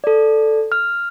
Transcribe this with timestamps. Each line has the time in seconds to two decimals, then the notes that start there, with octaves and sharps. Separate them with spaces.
0.04 A4 D5
0.72 F6